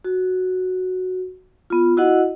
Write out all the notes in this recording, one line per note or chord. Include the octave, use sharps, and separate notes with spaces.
F#4
B3 F4
E4 F#4 D#5 F#5